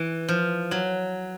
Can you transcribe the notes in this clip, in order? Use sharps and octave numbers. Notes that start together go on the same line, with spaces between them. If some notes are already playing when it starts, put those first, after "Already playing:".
Already playing: E3
F3
F#3